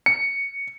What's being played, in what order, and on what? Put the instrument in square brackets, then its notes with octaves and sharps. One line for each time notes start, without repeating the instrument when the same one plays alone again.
[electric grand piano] C#7